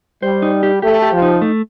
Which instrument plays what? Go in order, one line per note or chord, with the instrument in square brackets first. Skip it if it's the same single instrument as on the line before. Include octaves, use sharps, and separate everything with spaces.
[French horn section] G3 [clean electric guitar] C5
[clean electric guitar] D#4
G4
[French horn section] A3 [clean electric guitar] G4
[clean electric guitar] G4
[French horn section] F3
[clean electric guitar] D#4
A3